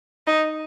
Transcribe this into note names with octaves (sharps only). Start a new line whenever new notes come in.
D#4